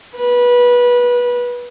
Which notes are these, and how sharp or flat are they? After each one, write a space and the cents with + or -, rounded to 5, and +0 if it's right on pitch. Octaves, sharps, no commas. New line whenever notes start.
B4 -20